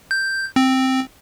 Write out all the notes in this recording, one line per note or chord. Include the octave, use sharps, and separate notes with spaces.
G6
C4